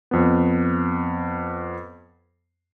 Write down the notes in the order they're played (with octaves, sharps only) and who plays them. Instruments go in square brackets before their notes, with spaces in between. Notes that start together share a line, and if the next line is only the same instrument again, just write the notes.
[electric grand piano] F2 B3